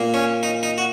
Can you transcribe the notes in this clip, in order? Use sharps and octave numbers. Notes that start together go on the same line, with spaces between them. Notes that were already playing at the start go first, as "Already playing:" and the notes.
Already playing: A#2 A#3
C#4
D#4
D#4
F#4